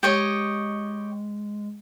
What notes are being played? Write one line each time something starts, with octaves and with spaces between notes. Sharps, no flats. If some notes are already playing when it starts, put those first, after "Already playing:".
G#3 G4 C#5 D#5